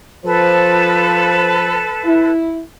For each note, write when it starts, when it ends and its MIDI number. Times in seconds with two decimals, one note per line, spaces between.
0.25 1.85 53
0.25 2.31 69
0.25 2.31 71
0.25 1.85 72
2.05 2.60 64